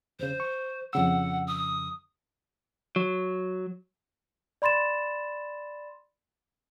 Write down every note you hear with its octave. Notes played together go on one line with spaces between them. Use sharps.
E2 C#3 C5
C#6
F2 C#3 F#5 E6
D#6
F#3
D5 B5 C6 A6 E7